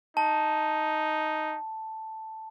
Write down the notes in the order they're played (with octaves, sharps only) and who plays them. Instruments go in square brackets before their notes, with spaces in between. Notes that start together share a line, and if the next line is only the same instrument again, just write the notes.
[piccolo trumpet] D#4 [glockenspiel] A5